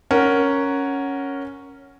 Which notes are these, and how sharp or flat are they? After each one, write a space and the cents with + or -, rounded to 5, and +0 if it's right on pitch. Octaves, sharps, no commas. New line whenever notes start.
C#4 +0 A#4 +0 F#5 +0